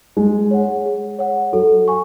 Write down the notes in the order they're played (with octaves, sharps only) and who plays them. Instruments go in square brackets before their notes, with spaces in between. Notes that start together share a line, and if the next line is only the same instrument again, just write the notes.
[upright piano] G#3 [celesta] G#4
[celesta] C#5 F#5
G#4
C#5 F#5
[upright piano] F#3 [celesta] A4
[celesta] G#5 C#6